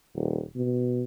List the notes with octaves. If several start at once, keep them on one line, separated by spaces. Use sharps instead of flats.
D#1
B2